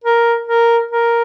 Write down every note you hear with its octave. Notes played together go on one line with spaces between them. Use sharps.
A#4
A#4
A#4